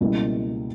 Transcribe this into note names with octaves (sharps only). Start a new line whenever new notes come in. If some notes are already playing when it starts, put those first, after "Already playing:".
C#2 B2 G3 A#3 E4